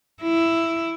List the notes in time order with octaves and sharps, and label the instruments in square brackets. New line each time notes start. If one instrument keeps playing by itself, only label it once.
[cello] E4